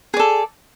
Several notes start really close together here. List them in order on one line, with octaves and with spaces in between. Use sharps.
G#4 D5 A4